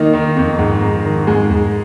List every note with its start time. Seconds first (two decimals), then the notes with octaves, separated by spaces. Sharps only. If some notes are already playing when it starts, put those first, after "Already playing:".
Already playing: D#3 A#3 D#4
0.13 D#3
0.36 F2
0.59 G#2
0.82 G#2
1.05 D#3
1.27 G#2 G#3
1.50 G#2